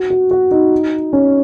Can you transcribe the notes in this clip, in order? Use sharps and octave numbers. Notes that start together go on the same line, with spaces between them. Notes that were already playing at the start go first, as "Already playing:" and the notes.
Already playing: F#4
F#4
F#4
D#4
C#4